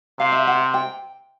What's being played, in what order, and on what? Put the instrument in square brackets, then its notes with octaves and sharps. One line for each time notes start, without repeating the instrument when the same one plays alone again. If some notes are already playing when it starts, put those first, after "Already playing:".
[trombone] C3 [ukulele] F5
[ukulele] E5
F#5
G5